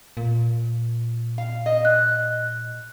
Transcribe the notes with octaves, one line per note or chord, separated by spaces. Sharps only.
A#2
F5
D#5
F#6